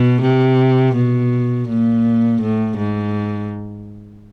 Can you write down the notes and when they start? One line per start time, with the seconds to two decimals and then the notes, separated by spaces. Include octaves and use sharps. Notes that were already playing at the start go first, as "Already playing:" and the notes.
Already playing: B2
0.21 C3
0.95 B2
1.68 A#2
2.41 A2
2.77 G#2